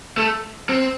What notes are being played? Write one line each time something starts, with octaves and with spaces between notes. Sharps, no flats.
A3
C4